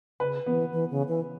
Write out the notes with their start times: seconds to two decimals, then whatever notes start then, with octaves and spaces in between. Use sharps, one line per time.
0.20 C#3 B4
0.46 E3 B3
0.73 E3
0.90 C#3
1.08 E3